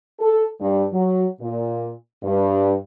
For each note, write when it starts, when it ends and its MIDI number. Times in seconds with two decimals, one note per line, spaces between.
0.20 0.44 69
0.59 0.84 43
0.92 1.26 54
1.40 1.91 46
2.23 2.74 43